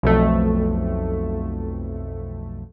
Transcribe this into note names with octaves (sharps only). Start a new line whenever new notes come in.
B1 F2 A3